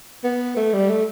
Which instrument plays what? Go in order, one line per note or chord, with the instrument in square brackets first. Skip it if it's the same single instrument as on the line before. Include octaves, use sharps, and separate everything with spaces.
[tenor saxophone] B3
A3
G3
A3